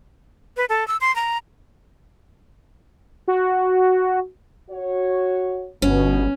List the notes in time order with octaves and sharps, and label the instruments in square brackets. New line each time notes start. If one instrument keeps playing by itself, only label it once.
[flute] B4
A4
E6
C6
A#5
[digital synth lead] F#4
[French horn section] F#4 C#5
[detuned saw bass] G1 [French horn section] B2 [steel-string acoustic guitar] C#4